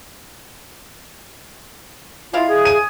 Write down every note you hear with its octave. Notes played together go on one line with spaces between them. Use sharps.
G#3 E4 F4 F5
G#4 G#5 D#6 G#6
D#7